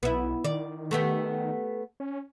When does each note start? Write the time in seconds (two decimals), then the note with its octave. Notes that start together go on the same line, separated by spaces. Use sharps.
0.03 B1 B3 E4
0.45 D#3 D5
0.91 A3 B3 G4
2.00 C#4